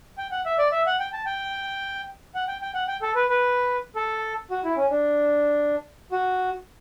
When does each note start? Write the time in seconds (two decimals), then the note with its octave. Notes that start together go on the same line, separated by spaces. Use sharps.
0.18 G5
0.31 F#5
0.46 E5
0.59 D5
0.72 E5
0.87 F#5
1.00 G5
1.13 A5
1.26 G5
2.35 F#5
2.48 G5
2.62 G5
2.74 F#5
2.88 G5
3.02 A4
3.15 B4
3.29 B4
3.96 A4
4.51 F#4
4.64 E4
4.77 C#4
4.90 D4
6.12 F#4